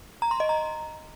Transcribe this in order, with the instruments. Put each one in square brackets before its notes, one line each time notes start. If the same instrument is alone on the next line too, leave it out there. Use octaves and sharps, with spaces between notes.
[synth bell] A#5
C6
D#5
A#5